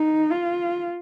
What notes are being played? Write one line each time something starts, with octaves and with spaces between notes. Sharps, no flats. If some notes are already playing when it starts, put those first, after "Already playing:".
Already playing: D#4
F4